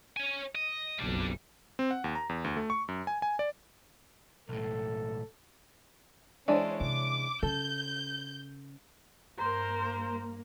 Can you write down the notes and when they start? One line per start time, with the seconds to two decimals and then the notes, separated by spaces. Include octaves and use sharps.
0.17 C#5 G#5
0.55 D#5
0.99 F#1 B1 F2 G3 D4
1.79 C4
1.91 F#5
2.04 D#2
2.15 A#5
2.29 E2
2.44 D2
2.57 A3
2.70 C#6
2.88 F#2
3.07 G#5
3.22 G#5
3.39 D5
4.49 B1 A2 A4
6.48 E3 G#3 C#4 D4 C5
6.80 C3 D6
7.43 C#3 A4 G6
9.38 G2 A#3 A#4 C5 A#5 C6